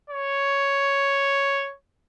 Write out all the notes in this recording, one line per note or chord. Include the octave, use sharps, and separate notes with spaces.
C#5